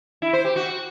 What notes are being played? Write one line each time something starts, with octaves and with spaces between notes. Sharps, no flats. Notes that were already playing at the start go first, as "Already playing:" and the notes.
E4
C5
G4
F#4